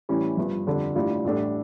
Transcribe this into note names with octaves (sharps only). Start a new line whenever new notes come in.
A2 E3 G3 C#4
G1 G2 F3
F2 D3 G3 D4 A4
A1 A2 G3 D4 F4
A1 A2 G3 D4 A4